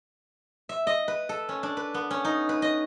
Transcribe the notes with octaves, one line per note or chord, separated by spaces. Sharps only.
E5
D#5
B4
A4
C#4
D4
B4
B3
C#4
D#4
B4
D#5